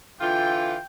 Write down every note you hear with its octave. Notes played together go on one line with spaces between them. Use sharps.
D3 E3 F4 G5